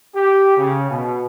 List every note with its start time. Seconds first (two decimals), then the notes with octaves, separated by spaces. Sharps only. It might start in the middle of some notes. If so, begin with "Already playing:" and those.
0.14 G4
0.57 C#3
0.89 B2